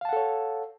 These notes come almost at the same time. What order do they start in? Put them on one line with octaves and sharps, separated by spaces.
F5 A5 F#5 A4 C#5